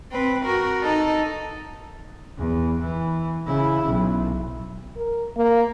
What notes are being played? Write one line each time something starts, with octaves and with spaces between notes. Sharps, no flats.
C4 B4
F#4 A#4
D#4 A4
E2
E3
C#3 E4
B1
A#4
A#3